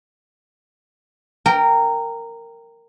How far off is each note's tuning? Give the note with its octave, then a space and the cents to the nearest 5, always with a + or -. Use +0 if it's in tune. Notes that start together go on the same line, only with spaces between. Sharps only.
A#4 -15 G5 +0